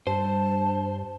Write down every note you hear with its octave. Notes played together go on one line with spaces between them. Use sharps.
G2 C5 A5